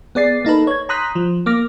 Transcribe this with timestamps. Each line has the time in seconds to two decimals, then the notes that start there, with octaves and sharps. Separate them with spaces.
0.15 B3 G#4 D5 A6 C7
0.45 A#3 D#4 A4 B4
0.67 C#5 G#6
0.89 A#5 C6 D#6 F#6 G6 B6
1.15 F3
1.46 A#3 D6 F6 A#6